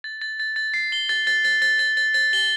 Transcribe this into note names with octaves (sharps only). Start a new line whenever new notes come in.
A6
A6
A6
A6
C7
G7
A6
A6
A6
A6
A6
A6
A6
G7